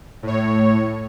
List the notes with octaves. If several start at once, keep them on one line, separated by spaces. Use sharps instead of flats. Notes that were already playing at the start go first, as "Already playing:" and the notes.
A2 C#5